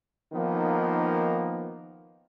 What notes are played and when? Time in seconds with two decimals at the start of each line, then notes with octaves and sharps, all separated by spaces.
0.33 D#3 F3 A#3 B3 D#4